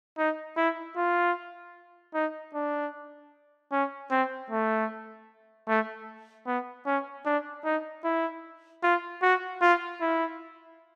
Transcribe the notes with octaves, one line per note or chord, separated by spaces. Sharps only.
D#4
E4
F4
D#4
D4
C#4
C4
A3
A3
B3
C#4
D4
D#4
E4
F4
F#4
F4
E4